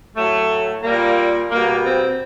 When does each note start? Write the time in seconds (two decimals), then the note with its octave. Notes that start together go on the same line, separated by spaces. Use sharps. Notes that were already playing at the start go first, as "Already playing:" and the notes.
0.15 A2 F#3 A3
0.83 G3 A#3
0.88 A#2
1.50 B2 G3 A#3
1.84 C4